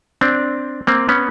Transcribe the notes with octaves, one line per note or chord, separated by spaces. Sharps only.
C4 D4
A#3 C4
B3 C#4